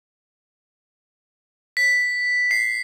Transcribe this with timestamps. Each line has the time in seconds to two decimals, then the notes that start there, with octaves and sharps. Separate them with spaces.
1.77 B6
2.51 C7